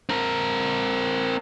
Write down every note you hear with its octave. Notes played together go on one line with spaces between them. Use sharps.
C4 A#4